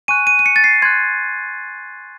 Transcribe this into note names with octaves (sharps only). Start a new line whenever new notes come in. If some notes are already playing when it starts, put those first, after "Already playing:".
G#5 C#6 F#6 D#7
D#7
D#7
C#7
A6
C7
C6 F#6 G#6